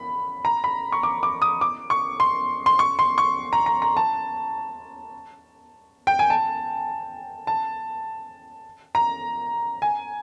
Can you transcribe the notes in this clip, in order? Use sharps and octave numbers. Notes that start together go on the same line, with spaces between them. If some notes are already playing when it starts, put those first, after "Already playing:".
Already playing: B5
A#5
B5
C#6
D6
D6
D#6
D6
C#6
C6
C6
C#6
C6
C#6
A#5
A#5
A#5
A5
G5
G#5
A5
A5
A#5
G#5